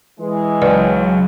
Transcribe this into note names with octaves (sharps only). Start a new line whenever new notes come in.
E3 G#3
C#2 C#3 F#3 B4 D5